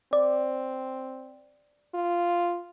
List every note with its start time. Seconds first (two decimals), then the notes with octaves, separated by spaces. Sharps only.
0.13 C4 D5
1.94 F4